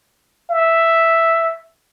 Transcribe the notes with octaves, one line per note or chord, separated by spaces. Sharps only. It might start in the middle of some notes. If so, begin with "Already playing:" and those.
E5